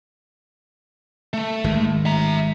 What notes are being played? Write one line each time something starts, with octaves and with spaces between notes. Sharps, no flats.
A3
G#1 D#3 G#3
E5 A#5